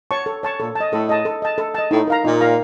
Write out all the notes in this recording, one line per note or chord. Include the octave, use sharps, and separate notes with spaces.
C#5 A5 C#6
A4
C#5 A5 C#6
A#2 A4
D#5 A5
A2 A4
D#5 A5
A4
D#5 A5
A4
D#5 A5
A2 D#4
A#4 F5 A#5
A#2 D#4
A#4 F5 A#5